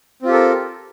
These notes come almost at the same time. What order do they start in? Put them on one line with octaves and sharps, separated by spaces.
C4 F4 G4 A4 A#4